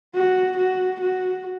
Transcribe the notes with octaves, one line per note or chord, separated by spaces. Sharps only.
F#4
F#4
F#4